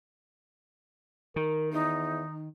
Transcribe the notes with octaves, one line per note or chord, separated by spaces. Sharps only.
D#3 A#4
E2 D#4